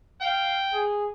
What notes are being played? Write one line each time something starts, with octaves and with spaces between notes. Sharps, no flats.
F5 G5
G#4